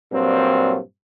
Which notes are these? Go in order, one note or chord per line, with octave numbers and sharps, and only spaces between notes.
G2 A#2 F#3 C4